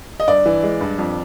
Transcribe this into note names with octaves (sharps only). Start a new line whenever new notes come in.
D#5
G2 D5
E3
G#3
G2
F2